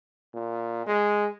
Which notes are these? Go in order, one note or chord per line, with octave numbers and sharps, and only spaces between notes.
A#2
G#3